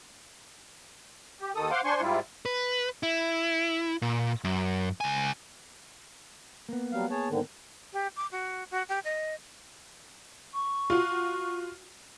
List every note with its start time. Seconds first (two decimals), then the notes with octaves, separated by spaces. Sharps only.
1.41 G4
1.55 D#2 D#3 A4 D#6
1.71 C5 F5 F#5 C6 D6
1.85 D4 C5 G#5 C6 C#6
2.01 G#2 G3 E4 F4
2.45 B4
3.03 E4
4.02 A#2
4.44 F#2
5.01 C#2 G#5
6.69 A#3 B3
6.92 F#3 G3 F5
7.11 G#4 C#5 A5
7.29 G#2 D3 D#3
7.93 G4
8.16 D6
8.32 F#4
8.71 F#4
8.89 G4
9.04 D#5
10.52 C#6
10.90 F4 F#4